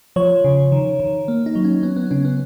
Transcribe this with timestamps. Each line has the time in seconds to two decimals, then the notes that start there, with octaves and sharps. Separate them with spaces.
0.16 F3 C#5
0.44 C#3
0.72 D#3
1.00 D#3
1.28 A#3
1.46 D#4
1.55 F#3
1.64 C#4
1.83 B3 C#4
1.96 B3
2.10 C#3 C#4
2.25 B3